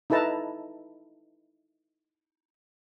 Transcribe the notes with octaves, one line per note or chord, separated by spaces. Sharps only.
D#4 E4 A4 B4 A5 A#5